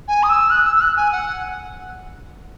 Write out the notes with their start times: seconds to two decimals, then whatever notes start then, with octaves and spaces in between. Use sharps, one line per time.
0.08 G#5
0.23 D#6
0.30 E6
0.51 F#6
0.65 E6
0.76 E6
0.81 F#6
0.97 G#5
1.12 F#5